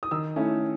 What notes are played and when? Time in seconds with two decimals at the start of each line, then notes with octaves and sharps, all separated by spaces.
0.03 D#6
0.11 D#3 E6
0.36 A3 C#4 E4